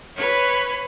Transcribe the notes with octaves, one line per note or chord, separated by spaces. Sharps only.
B4 C#5